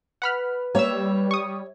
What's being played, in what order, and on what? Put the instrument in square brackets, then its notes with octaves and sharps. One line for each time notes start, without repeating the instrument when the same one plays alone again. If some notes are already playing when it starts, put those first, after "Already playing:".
[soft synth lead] B4 [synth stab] F#5 B5 F6
[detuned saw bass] G3 [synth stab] A#3 E6 [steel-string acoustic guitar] C#5 E5
[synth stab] C#6 D#6